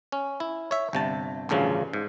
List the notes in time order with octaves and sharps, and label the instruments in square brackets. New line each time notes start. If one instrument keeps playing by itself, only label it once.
[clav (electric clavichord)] C#4
E4
C#5 E5
G1 C3 A5
A1 D2 G2 C#3 F3
G#2